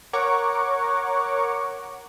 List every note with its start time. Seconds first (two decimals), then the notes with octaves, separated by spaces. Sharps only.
0.13 A#4 C#5 F#5 A#5 C#6 D6